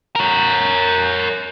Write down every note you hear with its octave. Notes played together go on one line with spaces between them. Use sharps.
A#4 C#5